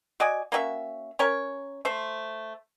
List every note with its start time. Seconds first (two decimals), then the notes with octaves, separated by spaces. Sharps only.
0.20 F#4 D5 D#5 G#5
0.52 A#3 C#4 F#4 E5
1.19 C#4 A#4 C#5
1.85 A3 C5